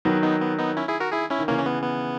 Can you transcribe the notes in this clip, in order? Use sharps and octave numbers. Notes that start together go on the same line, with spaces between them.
D#3 F#3 B3
B3 D#4
B3
B3 D#4
C#4 E4
E4 G#4
F#4 A#4
E4 G#4
C#4 E4
D#3
C#3 E3 A#3 C#4
C#4
B3
B3